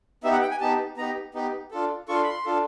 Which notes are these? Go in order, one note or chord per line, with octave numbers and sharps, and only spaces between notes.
B3 D#4 G4 E5
F#5
G5
G#5
B3 D#4 G4 A5
B3 D#4 G4 A#5
B3 D#4 G4
D4 F4 A4
D4 F4 A4 C#6
C6
B5
C6
D4 F4 A4